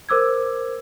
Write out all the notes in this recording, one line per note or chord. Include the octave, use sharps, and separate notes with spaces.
A#4 C5 D6 E6 G#6